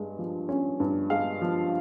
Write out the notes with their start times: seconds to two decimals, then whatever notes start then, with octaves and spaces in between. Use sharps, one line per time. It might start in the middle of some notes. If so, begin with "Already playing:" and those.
Already playing: G2 G#3
0.19 F3
0.49 C#4
0.80 G2
1.10 G#3 F5
1.41 F3